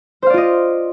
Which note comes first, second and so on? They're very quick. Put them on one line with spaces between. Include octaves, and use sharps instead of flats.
C5 F5 D5 F4 D#5